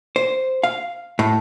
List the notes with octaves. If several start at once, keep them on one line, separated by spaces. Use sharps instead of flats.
C5
F5
A2